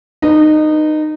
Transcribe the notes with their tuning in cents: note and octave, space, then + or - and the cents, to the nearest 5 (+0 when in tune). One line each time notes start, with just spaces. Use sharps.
D#4 -20 B4 +0